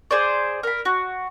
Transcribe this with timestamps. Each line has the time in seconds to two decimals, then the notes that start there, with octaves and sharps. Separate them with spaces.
0.11 G#4 C5 D5
0.63 A#4 B5
0.85 F#4